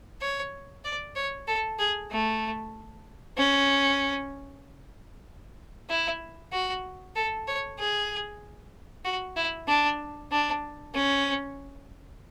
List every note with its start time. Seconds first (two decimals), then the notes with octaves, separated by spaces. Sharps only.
0.21 C#5
0.84 D5
1.16 C#5
1.47 A4
1.79 G#4
2.11 A3
3.37 C#4
5.89 E4
6.52 F#4
7.16 A4
7.47 C#5
7.79 G#4
9.05 F#4
9.36 E4
9.68 D4
10.32 D4
10.94 C#4